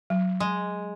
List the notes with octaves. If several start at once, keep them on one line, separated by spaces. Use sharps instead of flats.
F#3
G#3